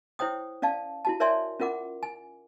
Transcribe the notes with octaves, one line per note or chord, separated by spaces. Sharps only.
E4 C5 C#5 G5 D#6
C#4 D5 F5 A5
E4 F#4 A5
A#4 C#5 D5 E5 G#5 C6
C#4 F4 A#4 F#5 D6
G#5